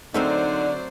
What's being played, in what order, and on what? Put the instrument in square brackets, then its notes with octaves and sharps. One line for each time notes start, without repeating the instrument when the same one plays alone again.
[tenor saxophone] D3 [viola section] F#3 C5 D5 [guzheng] A3 C4 A#4 [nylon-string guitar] D#4